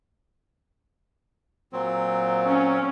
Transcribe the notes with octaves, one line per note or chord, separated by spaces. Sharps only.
A#2 F#3 C4
C#4